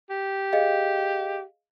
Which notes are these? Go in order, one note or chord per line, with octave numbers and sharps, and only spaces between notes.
G4
G#4 D#5 F5